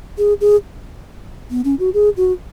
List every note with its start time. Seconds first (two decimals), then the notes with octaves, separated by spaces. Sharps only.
0.18 G#4
0.41 G#4
1.51 B3
1.65 C#4
1.79 F#4
1.94 G#4
2.17 F#4